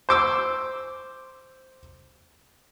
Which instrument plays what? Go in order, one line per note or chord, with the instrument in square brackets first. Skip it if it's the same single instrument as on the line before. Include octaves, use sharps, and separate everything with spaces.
[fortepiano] C5 D6 E6